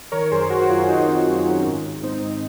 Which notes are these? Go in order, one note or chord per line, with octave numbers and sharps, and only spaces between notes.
D#3 A#4 C#5
F#2 G#4 C5
F#2 F#4 A#4
F#4
F#2 F4 G#4
F#2 D#4 F#4
D#3 C4 D#4
F#2 C4
D#3 C#4
G#2
G#2
G#2 C4 D#4
G#2